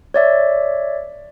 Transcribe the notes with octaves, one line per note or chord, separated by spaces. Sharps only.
C#5 D5 E5